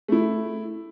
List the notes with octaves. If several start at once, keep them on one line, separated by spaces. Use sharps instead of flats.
A3 E4